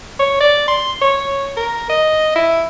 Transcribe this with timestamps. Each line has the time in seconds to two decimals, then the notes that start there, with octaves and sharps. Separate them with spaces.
0.19 C#5
0.40 D5
0.68 C6
1.02 C#5
1.57 A#4
1.90 D#5
2.36 E4